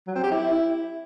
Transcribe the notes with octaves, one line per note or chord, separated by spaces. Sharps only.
F#3
C4
G4
E4